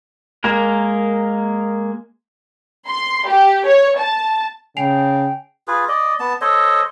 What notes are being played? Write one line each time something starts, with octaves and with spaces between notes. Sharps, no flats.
G#3 A#3 A#4
C6
G4
C#5
A5
C#3 G5 G#5 C7 F7
F4 G#4 B4
D5 D#5
B3 A5
A4 C5 C#5 D#5